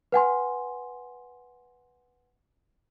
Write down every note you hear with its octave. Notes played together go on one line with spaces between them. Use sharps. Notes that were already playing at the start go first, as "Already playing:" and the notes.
B4 F#5 G#5 C6